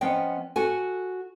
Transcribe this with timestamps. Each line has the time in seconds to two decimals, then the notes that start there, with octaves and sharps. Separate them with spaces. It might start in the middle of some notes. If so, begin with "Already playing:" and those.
0.01 F3 B3 C#4 D#5 G5
0.56 F#4 A4 G#5